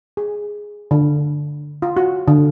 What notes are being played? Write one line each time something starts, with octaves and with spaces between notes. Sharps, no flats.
G#4
D3
F4
F#4
D3